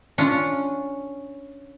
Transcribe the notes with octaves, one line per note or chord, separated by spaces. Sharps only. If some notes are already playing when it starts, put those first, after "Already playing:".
C#4 D4 F4